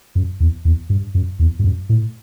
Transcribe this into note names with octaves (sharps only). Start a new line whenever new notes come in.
F#2
E2
E2
G2
F#2
E2
G2
F#2
A2